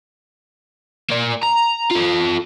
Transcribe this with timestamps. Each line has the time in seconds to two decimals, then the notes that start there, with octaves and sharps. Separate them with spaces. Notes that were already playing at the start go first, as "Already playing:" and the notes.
1.10 A#3 D5
1.43 A#5
1.91 F4 A4